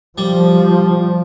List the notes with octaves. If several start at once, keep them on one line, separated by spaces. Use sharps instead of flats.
F3 G3